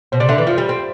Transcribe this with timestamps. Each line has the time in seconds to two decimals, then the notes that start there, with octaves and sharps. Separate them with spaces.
0.12 B2 C5
0.20 C3 D5
0.29 D3 E5
0.37 E3 D5
0.46 F3 F4
0.58 G3
0.69 C4